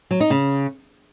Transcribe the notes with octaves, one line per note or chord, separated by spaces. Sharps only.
F#3
D#4
C#3